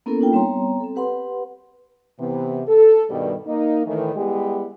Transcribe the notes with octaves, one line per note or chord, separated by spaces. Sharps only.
A#3 B3 C#4 E4 A4 A#4
A#3 D4 D#4 F4 G5
G3 B3 C4 C#5 A#5 C6
C4 A4
G4 B4 F#5 B5 C6
C3 E3 B3
A4
G2 B2 D#3 G3
A#3 D#4
A2 D#3 E3
G3 G#3 B3 E4 G4